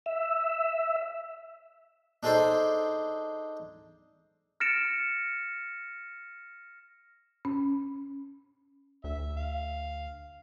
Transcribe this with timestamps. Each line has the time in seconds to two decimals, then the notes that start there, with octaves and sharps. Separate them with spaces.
0.06 E5
2.23 D4 D#4 G#4 A4 C5 D5
4.60 F6 A6 A#6 C#7 D7 E7
7.45 C#4
9.04 D2 E5
9.37 F5